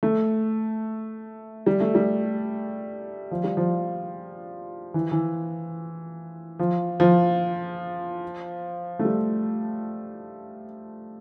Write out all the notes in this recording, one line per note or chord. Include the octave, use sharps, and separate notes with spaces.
A3
G3
A3
G3
F3
G3
F3
E3
E3
F3
F3
A3
G3